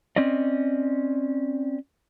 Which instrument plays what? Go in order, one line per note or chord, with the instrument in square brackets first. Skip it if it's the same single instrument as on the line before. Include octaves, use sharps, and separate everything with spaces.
[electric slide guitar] C4 C#4 D5 D#5